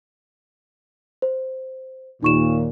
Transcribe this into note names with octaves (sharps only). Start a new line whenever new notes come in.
C5
D#2 A#2 D#4 C#6 E7